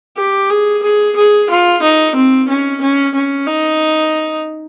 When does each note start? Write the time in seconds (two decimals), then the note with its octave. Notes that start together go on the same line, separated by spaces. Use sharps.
0.17 G4
0.50 G#4
0.83 G#4
1.16 G#4
1.50 F4
1.82 D#4
2.16 C4
2.48 C#4
2.81 C#4
3.15 C#4
3.47 D#4